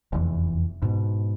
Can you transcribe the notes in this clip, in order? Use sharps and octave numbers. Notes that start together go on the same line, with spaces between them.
F1 E2 E3
G#2 B2